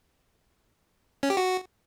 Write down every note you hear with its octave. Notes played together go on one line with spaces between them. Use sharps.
C#4
G4
F#4